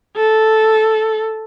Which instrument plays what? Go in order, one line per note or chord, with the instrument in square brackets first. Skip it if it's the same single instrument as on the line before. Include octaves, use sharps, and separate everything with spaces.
[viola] A4